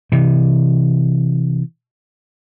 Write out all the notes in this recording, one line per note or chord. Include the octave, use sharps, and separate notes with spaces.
C3 E3